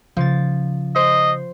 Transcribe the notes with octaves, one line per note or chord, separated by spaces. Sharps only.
C#3 F3 A6
C5 D#5